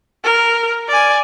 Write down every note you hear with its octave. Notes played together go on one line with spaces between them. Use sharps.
A#4
D5 G#5